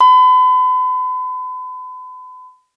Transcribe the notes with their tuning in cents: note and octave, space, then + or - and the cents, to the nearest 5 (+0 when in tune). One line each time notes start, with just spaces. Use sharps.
B5 +40